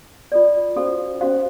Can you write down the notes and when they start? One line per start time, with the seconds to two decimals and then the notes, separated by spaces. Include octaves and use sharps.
0.32 F4 A4 D5
0.76 C#4 F#4 A4 C5 F5
1.21 C#4 F#4 A4 C5 F5